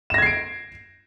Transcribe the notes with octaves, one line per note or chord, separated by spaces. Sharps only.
G#6 A#6 C7 D7 E7